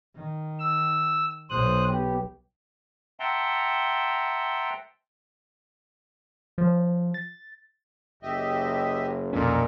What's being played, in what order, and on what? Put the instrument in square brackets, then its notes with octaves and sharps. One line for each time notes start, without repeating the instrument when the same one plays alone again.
[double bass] D#3
[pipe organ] E6
[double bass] B1 [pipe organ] C5 D#6 F#6
[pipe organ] B3 G4
[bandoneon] E5 F#5 G5 A5 A#5 C6
[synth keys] F3
A6
[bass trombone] F#1 [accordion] G4 D#5 E5
[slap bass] B1 F2 C#4 [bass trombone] A#2 [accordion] D#4 A4 A#4